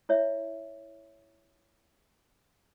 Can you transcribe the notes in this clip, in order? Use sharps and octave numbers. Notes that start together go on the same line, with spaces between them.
E4 C#5 E5